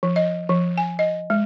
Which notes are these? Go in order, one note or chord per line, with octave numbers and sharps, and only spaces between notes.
F3
D#5
F3
G#5
D#5
G#3